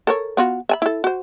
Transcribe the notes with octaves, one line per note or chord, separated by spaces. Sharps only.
A4 A#4 C#5
B3 F4 F#4
E5 G#5 B5
E4 A4
F#4 C5